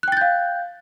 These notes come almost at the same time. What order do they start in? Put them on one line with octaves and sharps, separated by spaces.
F#6 G5 A6 G6 F5